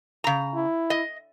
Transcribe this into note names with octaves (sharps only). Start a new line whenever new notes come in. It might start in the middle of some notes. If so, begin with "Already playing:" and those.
C#3 A#5
E4
D#5